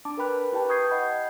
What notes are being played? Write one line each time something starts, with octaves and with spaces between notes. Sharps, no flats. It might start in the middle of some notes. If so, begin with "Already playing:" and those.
D4 A5 D6
A#4 B4 G5 B5 F#6
E4 G4 B4 G5 A5
C#6 D#6 G6 G#6 C7
D#5 F#5 B5 G6